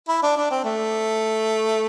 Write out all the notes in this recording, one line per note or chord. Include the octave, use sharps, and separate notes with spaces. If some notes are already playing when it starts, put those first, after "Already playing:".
E4
D4
D4
C4
A3